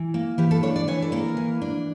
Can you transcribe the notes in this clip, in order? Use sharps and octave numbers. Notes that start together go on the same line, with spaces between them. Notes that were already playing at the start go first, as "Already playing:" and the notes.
Already playing: E3
A#3
E3 G4
A4
D4 C#5
D5
E3 C#5
A4
A#3 A#4
E3
D4